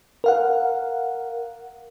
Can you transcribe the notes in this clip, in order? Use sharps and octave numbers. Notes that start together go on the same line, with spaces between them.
A#4 F5 F#5